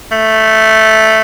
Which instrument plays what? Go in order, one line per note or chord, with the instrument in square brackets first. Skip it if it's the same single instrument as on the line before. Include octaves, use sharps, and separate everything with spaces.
[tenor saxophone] A3